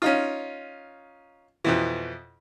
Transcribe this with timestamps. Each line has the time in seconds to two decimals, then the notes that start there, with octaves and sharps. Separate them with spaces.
0.02 C#4 D#4 F4
1.64 F2 B2 E3